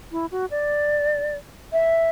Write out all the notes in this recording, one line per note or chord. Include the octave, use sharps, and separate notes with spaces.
E4
F#4
D5
E5